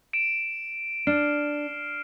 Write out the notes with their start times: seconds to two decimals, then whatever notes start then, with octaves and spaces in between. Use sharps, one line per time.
0.13 D7 E7
1.07 D4 F6 C7